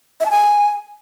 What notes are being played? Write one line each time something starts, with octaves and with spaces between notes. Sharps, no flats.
E5
A5
G#5